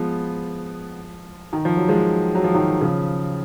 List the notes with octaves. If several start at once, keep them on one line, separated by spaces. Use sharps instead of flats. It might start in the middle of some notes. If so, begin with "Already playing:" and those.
Already playing: F3 G#3 B3
D#3
F3
F#3
F3 G#3
F#3
F3
D#3 F#3
C#3 F3